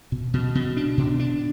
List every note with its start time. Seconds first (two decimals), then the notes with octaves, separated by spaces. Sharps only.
0.12 B2
0.34 B2
0.55 B2
0.77 D4
0.98 B2
1.20 D4